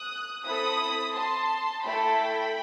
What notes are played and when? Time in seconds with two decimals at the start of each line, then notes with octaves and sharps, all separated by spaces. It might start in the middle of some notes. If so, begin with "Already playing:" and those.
Already playing: D#6 F#6
0.44 C4 E4 A4 B5 D#6
1.14 A5 C6
1.84 A3 E4 A4 G5 B5